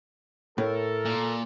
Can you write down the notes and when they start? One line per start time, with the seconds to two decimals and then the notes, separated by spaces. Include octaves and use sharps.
0.58 A2 A4 A#4
1.05 A#2